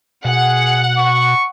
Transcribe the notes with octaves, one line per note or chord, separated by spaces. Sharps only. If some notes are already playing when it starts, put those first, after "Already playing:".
B2 G#4 F#5
C#6